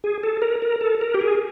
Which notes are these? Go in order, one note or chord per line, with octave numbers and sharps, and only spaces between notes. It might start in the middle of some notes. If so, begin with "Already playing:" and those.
G#4
A4
A#4
A#4
A4
A#4
G4
G#4